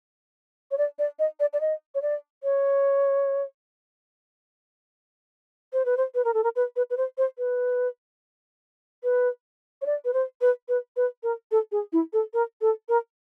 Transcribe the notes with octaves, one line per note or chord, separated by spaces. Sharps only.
C#5
D5
D5
D#5
D5
D5
D#5
C#5
D5
C#5
C5
B4
C5
B4
A#4
A4
A#4
B4
B4
B4
C5
C5
B4
B4
C#5
D5
B4
C5
B4
B4
B4
A#4
A4
G#4
E4
A4
A#4
A4
A#4